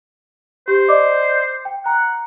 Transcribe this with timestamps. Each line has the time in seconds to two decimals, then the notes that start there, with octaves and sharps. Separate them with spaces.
0.68 G4 C5
0.88 D5 D#5 D6
1.65 G5
1.86 F#5 A#5